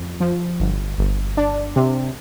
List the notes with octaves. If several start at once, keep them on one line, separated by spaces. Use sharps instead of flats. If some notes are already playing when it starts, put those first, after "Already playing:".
Already playing: F2
F3
G1
G1
D4
C3